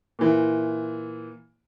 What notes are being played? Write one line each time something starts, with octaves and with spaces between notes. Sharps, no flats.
A#2 E3